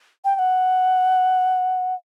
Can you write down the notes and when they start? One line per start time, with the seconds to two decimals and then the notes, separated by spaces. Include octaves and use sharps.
0.25 G5
0.35 G5
0.39 F#5